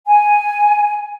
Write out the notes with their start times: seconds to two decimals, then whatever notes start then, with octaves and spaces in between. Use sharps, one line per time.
0.06 G#5